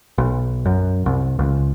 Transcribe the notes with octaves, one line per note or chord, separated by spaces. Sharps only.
B1
F#2
C2
C#2